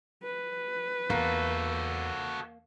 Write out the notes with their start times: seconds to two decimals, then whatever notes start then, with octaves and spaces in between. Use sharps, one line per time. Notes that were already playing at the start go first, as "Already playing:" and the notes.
0.23 B4
1.10 E2 A#3 F#4 A4